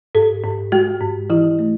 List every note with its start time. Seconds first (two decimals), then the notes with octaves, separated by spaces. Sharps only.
0.15 G#2 A4
0.44 G#2
0.72 G#3 F#4
1.01 G#2
1.30 E3 E4
1.59 A3